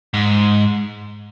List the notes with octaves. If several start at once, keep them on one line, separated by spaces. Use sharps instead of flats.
G#2